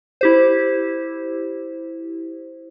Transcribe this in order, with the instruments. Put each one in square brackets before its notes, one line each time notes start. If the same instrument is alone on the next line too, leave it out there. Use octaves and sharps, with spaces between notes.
[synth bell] E4 G4 C5